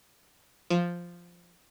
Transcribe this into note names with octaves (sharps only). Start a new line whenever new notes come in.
F3